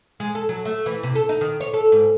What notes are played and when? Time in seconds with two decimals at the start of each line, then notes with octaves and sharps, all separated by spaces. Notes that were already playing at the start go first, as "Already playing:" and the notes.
0.20 G#3
0.35 A4
0.49 F#3
0.65 A3
0.86 E3
1.03 C3
1.15 A4
1.29 D#4
1.41 D#3
1.61 C#5
1.74 A4
1.92 G#2